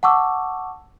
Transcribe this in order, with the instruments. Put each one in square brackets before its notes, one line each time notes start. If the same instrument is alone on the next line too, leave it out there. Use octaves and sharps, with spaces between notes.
[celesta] F#5 A5 C#6 D6 E6